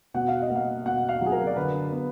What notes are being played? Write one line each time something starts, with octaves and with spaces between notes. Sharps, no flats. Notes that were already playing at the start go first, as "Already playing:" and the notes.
B2 F#5
F5
D#5
A#3
F5
B2 F#5
F5
F#3 G#4
A#4
D5
D3 B4
B3